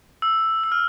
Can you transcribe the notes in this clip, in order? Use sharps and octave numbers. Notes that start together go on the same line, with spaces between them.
E6
E6
F6